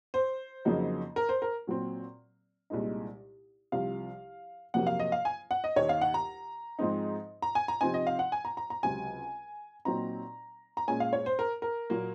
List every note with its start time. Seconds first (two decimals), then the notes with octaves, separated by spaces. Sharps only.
0.14 C5
0.65 F2 C#3 F#3 A#3 D#4
1.16 A#4
1.29 C5
1.42 A#4
1.67 A#2 F#3 C4
2.70 C2 A#2 G#3 D#4
3.72 C2 C3 F3 F5
4.74 F2 C3 F#3 A#3 F#5
4.87 F5
5.00 D#5
5.12 F5
5.25 G#5
5.51 F#5
5.64 D#5
5.76 D#2 D#3 A#3 D#4 C#5
5.89 F5
6.01 F#5
6.14 A#5
6.79 G#2 F3 G#3 C4 D#4
7.42 A#5
7.55 G#5
7.68 A#5
7.81 C3 F3 C4 D#4 G#5
7.94 D#5
8.07 F5
8.19 F#5
8.32 G#5
8.45 A#5
8.57 A#5
8.70 A#5
8.83 C#2 C3 F#3 C4 G#5
9.85 A#2 F#3 C4 D#4 A#5
10.77 A#5
10.88 A#2 G#3 C#4 G#5
11.00 F5
11.13 C#5
11.26 C5
11.39 A#4
11.62 A#4
11.90 A#2 F#3 A#3